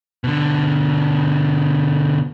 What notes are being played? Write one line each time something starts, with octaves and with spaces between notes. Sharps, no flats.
B2 D3